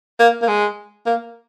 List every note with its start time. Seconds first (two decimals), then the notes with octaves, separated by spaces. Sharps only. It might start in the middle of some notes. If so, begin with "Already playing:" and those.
0.19 A#3
0.42 A#3
0.48 G#3
1.06 A#3